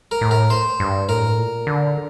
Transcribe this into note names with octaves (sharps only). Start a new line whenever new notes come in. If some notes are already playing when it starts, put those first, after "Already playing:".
A#4
A2
A#4
C5
G2
A2 A#4
A#2
D3